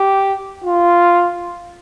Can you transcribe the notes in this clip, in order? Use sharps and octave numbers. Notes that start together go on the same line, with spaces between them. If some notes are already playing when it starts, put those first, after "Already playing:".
Already playing: G4
F4